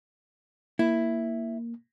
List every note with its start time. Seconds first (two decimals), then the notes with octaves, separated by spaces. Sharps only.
0.79 A#3 E4